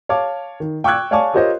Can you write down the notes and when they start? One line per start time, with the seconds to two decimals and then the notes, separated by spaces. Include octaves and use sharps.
0.09 C#5 F5 A5 D6
0.60 D#3
0.84 G5 C#6 D6 E6 F#6 G#6
1.11 C#5 D5 F5 G#5 A5 C#6
1.34 F4 G4 A#4 C5 C#5 D#5